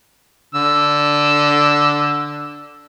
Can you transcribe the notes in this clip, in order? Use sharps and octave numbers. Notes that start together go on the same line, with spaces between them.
D3 E6